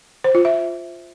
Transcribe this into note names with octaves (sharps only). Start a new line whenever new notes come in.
C5
F4
E5